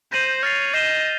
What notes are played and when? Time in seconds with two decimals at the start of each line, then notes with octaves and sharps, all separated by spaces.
0.12 C5 G6 A#6 D#7 F#7
0.43 C#5 F6 A6 C7 F7
0.74 D#5 G6 C7 E7 G7